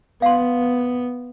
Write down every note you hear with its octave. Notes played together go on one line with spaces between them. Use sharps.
B3 F5 C6